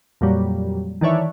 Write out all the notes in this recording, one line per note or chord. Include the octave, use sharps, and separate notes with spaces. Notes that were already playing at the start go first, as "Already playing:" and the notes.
F2 A#2 F#3 G3
D#3 E3 D4 C#5 E5